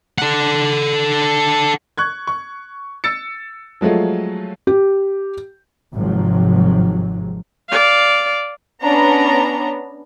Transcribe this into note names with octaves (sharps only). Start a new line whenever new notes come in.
A4 F#5
C#6 F#6 G#6
C#6
E6 A6 C#7
F3 F#3 G#3 A3 F4
G4
G#1 G#2 C3 F3 F#3
D5 F5
B3 C#4 D4 A#5